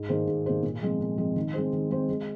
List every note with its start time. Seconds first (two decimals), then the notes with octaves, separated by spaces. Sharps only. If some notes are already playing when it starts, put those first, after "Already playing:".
Already playing: G#2
0.09 D#3 A#3 G#4 C5
0.27 G#2
0.46 D#3 A#3 G#4 C5
0.63 A#2
0.82 F3 G#3 C4
1.00 A#2
1.18 F3 G#3 C4
1.36 D#3
1.54 G#3 C4 G#4 C5
1.73 D#3
1.91 G#3 C4 G#4 C5
2.09 G#3